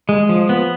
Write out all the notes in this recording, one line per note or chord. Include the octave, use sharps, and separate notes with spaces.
G#3
F3
B3